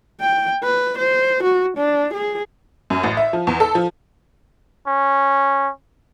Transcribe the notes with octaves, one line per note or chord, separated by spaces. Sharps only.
G5
B4
C5
F#4
D4
G#4
F#2
A1
E5
F3
E2
A4
F3
C#4